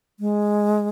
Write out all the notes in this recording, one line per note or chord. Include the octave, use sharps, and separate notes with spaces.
G#3